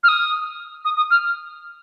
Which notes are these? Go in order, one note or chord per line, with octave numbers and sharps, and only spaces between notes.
F6
D#6
D#6
D#6
F6